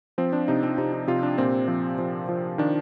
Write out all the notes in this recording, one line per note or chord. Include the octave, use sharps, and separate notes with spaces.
F3 C4
D4
C3 D#4
C4
C3 D#4
D#4
C3 F4
D4
A#2 C4
F3
F3
F3
D#3 D4